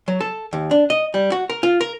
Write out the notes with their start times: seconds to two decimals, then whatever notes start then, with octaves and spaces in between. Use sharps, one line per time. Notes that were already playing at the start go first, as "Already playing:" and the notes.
0.08 F#3
0.21 A4
0.53 D#2
0.71 D4
0.90 D#5
1.14 G3
1.32 F#4
1.50 A#4
1.63 F4
1.81 A#4